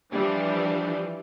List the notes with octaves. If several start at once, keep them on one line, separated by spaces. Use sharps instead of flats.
E3 F3 G3 D4